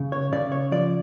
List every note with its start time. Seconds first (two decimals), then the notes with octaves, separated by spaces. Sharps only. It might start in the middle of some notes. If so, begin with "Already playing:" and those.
Already playing: C#3
0.12 C#5
0.32 C#3 D5
0.52 C#5
0.71 F3 D5